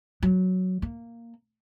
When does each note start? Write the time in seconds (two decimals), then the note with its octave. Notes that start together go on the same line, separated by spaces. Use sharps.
0.23 F#3
0.82 A#3